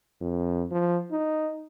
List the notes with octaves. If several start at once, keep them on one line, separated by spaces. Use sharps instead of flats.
F2
F3
D#4